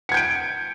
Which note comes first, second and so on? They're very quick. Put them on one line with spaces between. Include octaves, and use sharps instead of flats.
C#7 G#6 G6 D7